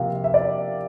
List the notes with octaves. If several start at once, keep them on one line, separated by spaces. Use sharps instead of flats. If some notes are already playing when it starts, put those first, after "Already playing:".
Already playing: C3 F3 A#3 F5 G5
E5
D5